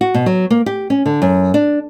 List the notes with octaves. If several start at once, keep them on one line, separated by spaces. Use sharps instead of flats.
F#4
B2
F#3
A#3
G4
C#4
D3
F#2
D4